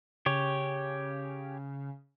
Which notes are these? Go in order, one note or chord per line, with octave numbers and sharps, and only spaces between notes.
C#3 G4 C#5